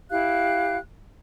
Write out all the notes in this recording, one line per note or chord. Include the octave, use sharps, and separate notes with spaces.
E4 G4 F5 F#6